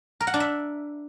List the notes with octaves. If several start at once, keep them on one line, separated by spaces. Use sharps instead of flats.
A#4
F#5
D4
E5